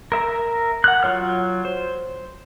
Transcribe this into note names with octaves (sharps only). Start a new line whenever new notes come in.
A#4 E5 A#5
F#5 F6 F#6
F#3 F4 C#5 F6
C5